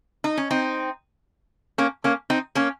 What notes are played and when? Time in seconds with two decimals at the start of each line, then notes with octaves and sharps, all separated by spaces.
0.24 D#4
0.37 C#4
0.51 C4 D#4
1.78 A#3 C#4
2.04 A#3 C#4
2.30 C4 D#4
2.55 A#3 C#4